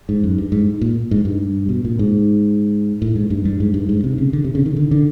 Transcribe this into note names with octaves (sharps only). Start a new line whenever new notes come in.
G#2
F#2
G2
G#2
A#2
G#2
G2
B2
A#2
G#2
A2
G#2
G2
G2
G#2
G2
G#2
C3
C#3
D3
C3
C#3
D#3
D3
D3